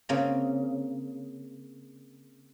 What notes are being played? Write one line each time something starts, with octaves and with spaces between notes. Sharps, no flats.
C#3 A#3 C4